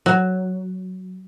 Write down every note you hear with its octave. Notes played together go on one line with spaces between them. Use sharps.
F#3